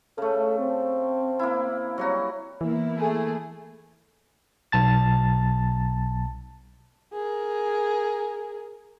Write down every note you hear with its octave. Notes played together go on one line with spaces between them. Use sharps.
C#3 A3 A4
C4
A#3 E4
F#3 G3 F#4
E3 A#3 B3 E4
A3 G#4
B1 A5 A6
G#4 A#4